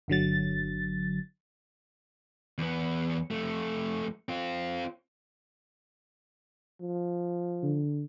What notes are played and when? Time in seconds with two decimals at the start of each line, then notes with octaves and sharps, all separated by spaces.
0.08 G1 D3 F#3 A6
2.58 E2 B3
3.31 F2 A3
4.29 C4 F4
6.81 F3
7.63 D3